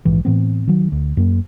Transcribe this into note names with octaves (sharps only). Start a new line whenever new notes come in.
A#1 G#2 E3
A2 E3 B3 C4
D#3 F#3
D2
F#2 A#3